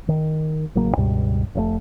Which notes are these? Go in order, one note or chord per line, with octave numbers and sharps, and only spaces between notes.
D#3
A1 C#3 F#3 A#3
C#2 G2 B2 G3
F1 B2 A3